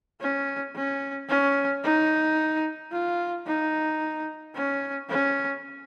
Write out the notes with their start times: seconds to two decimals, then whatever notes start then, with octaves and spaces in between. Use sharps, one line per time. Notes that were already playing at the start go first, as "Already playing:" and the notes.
0.21 C#4
0.75 C#4
1.29 C#4
1.84 D#4
2.92 F4
3.46 D#4
4.55 C#4
5.09 C#4